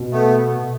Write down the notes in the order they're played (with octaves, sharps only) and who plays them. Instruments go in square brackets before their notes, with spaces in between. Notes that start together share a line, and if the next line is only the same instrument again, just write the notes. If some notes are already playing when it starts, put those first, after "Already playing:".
Already playing: [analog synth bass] B2
[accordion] A3 B3